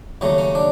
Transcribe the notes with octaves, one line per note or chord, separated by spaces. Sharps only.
D#2 C#3 F#3 A3
C#4
D4